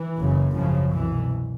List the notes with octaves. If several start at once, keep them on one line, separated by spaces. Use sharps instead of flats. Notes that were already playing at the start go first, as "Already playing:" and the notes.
Already playing: E3
F#1 F#2 C#3
G#1 F#2 C#3 F3
C2 B2 E3